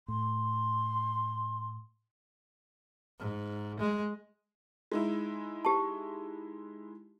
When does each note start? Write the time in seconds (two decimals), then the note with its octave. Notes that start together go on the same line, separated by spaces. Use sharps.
0.08 A2 C6
3.20 G#2
3.80 G#3
4.92 G#3 D#4 E4
5.65 G4 A5